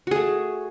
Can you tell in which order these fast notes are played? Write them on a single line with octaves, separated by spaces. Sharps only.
F#4 G#4 A3